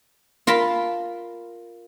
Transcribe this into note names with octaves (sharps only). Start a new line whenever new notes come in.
F4 A#4 A5 B5